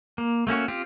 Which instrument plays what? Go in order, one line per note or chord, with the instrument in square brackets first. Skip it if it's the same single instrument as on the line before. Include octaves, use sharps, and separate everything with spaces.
[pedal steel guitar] A#3
A3 A#3 C#4 F#4
C4 F4 G4